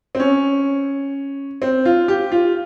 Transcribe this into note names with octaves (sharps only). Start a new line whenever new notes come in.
C4
C#4
C4
F4
G4
F4